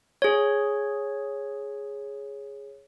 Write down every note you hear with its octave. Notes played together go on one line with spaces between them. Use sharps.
G#4 C#5